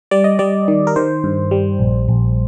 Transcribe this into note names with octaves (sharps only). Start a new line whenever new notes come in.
G3 D5
D#5
G3 D5
D#3
A#4
D#3 C5
G2
G3
A#1
A#1